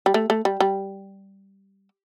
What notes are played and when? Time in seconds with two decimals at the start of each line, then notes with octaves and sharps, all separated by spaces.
0.06 G3
0.14 A3
0.30 A3
0.45 G3
0.60 G3